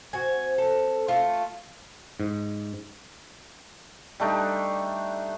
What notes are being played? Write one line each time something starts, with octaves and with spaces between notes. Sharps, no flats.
C4 F#4 G#5
A4
A3 F4
G#2
G3 A3 D4 D#4